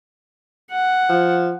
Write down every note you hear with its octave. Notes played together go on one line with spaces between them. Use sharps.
F#5
F3